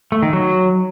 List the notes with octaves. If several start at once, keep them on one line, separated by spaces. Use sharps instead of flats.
A3
D#3
F#3